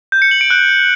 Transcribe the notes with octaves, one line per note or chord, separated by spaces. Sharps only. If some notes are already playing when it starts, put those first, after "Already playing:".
G6
C#7
F#7
D7
F#6